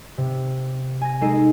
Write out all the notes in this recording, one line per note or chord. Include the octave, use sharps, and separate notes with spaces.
C3
G#5 A#6
G#3 D#4 A4 C7 D#7